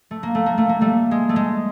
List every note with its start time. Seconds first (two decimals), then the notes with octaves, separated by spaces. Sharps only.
0.11 A3
0.23 A#3
0.35 A3
0.46 A#3
0.58 A3
0.69 A#3
0.81 G3 A3
1.11 G#3
1.29 A3
1.36 G#3